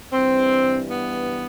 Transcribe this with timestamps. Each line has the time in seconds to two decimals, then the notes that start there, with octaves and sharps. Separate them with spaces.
0.12 G2 E3 C4
0.89 B3